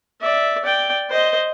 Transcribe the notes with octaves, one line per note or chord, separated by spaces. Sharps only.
D5 E5
D5 G5
C5 D#5